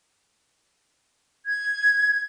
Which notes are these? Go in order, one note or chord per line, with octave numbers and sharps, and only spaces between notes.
G#6